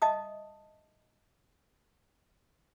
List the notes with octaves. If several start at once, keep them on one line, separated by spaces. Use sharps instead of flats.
D#5 E5 A5 D#6